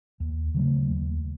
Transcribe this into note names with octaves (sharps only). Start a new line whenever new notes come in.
D#2
C#3 F#3 A3
D#2